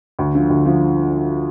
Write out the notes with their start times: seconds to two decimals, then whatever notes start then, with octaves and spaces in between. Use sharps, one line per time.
0.19 D2
0.34 D3 F3
0.50 D2
0.66 D3 F3